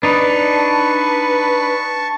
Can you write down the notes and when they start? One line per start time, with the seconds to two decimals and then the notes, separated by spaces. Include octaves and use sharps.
0.03 D4 D#4 B4 A5 C#6